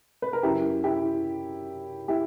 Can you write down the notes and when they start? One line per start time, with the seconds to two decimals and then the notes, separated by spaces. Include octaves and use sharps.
0.22 B4
0.33 A#4
0.43 F#2 C#3 F#3 E4 G4
0.84 E4 G4
2.08 E4 G4